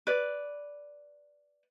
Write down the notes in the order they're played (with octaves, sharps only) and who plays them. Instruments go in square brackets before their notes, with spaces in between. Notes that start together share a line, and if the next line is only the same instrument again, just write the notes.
[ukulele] B4 D5